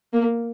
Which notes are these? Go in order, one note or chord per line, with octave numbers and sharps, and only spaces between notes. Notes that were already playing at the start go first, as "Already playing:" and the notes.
A#3